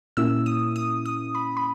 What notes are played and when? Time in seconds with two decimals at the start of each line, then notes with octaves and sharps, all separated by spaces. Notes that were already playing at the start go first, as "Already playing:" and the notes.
0.17 A#2 A#3 C#4 E4 E6
0.46 D#6
0.76 D#6
1.06 D#6
1.35 B5
1.57 B5